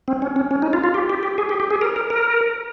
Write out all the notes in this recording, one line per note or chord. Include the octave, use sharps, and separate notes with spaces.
C4
C#4
C#4
C#4
D#4
F4
F4
G4
G4
G4
G#4
G4
G4
G#4
A#4
A#4
A#4